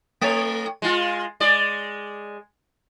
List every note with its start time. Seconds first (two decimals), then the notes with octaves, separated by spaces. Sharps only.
0.21 A3 C#5
0.82 G#3 F4
1.40 G#3 D5